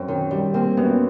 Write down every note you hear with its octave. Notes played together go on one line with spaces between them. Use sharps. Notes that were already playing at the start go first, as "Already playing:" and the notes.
Already playing: F#2 C4
D#3
G3
A#3 C4
F#2 B3